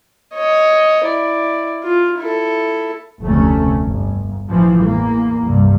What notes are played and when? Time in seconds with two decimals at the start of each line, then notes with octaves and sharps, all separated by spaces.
0.34 C#5 D#5
1.04 E4 D5
1.83 F4
2.18 E4 A4
3.23 F1 D2 C3 A3 C#4
3.84 G1
4.48 A1 E3 F3
4.86 E2 A#3
5.45 C2 G2